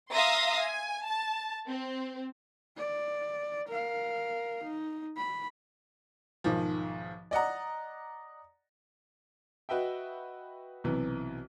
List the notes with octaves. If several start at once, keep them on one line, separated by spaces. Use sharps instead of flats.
E5 F5 A#5 C6 D#6 A#6
G#5
A5
C4
D5
A#4 F5
D#4
B5
B1 G#2 D#3 F3
D5 D#5 F#5 A#5
F#4 B4 D#5 E5 G5
B1 C3 E3